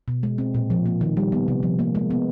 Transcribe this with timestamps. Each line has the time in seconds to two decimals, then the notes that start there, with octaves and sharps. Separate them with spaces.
0.08 B2
0.23 G#3
0.38 C4
0.55 A#2
0.70 F3
0.86 A#3
1.01 D#3
1.17 G3
1.32 B3
1.48 C3
1.63 F3
1.79 A#3
1.95 G#3
2.10 B3